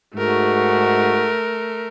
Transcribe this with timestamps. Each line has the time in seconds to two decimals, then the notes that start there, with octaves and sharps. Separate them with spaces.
0.15 G#2 A3 F#4 A#4